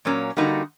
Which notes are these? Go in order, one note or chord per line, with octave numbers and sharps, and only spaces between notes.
A#2 F#3 A#3 C#4
D3 G3 A#3 D#4 F#4